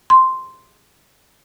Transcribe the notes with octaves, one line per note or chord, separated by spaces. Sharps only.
C6